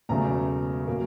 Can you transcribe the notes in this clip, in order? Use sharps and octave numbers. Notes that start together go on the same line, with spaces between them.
E1 E2 C#3 F#3 A3 A#5
C#3 F#3 A#3